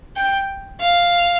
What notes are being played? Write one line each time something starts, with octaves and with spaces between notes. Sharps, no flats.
G5
F5